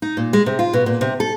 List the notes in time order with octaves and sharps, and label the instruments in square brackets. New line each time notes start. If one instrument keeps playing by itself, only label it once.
[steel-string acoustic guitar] D#4
A#2
G#3
C3
F4
B2
A#2
C3
A4